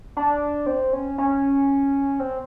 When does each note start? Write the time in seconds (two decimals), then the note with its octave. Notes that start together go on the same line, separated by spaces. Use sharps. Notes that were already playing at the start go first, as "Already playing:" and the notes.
0.17 D4
0.66 C4
0.93 C#4
1.18 C#4
2.20 C4